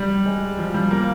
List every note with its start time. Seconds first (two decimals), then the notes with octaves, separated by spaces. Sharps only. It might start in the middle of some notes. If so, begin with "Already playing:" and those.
Already playing: G3
0.26 G#3
0.59 F3
0.74 G3
0.91 A#3